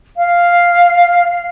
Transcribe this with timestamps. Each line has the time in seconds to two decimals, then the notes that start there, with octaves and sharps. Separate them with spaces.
0.17 F5